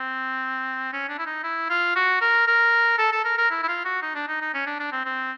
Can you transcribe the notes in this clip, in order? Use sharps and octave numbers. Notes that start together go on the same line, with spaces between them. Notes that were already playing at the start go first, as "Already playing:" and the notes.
Already playing: C4
C#4
D4
E4
D#4
E4
F4
F#4
A#4
A#4
A4
A4
A#4
A#4
E4
E4
F4
F#4
D#4
D4
D#4
D#4
C#4
D4
D4
C4
C4